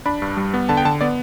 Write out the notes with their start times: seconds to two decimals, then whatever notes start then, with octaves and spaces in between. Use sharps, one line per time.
0.06 D4 B5
0.22 G2
0.37 G3
0.54 B3
0.69 D3 A5
0.77 G5
0.85 D3 A5
1.01 B3 D5